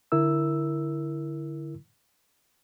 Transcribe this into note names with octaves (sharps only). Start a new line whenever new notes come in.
D3 E4 A#4 E6